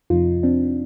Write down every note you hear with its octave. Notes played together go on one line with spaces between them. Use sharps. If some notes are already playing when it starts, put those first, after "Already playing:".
F2 C3 F3 D#4 F4
C4 D4